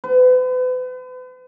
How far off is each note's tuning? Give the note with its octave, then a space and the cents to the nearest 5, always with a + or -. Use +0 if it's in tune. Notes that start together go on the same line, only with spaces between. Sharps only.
B4 +40